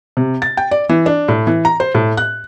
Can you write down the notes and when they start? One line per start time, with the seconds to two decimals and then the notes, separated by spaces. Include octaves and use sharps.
0.17 C3
0.42 A6
0.57 G5
0.71 D5
0.89 E3
1.06 D4
1.28 A2
1.47 E3
1.65 A#5
1.80 C5
1.95 A2
2.17 F#6